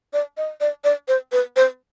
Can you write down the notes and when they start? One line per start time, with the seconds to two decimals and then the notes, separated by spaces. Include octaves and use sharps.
0.13 D5
0.37 D#5
0.61 D5
0.84 D5
1.08 C5
1.32 B4
1.56 C5